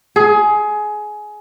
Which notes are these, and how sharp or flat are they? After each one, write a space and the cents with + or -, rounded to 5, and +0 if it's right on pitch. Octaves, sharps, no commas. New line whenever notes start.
G#4 +20